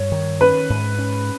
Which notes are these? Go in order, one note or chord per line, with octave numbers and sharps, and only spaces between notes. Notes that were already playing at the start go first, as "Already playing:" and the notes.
Already playing: G2 C#5
D#3
C#4 B4
G#2
C#4